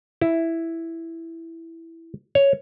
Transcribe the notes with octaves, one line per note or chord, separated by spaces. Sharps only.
E4
C#5